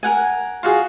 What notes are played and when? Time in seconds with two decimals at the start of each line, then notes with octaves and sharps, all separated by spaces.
0.03 A#4 F#5 G#5
0.63 F4 F#4 G#4